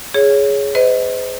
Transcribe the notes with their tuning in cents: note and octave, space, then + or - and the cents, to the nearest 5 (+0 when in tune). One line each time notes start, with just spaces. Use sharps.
G#4 +0 C#5 +10
C5 -45 D#5 +15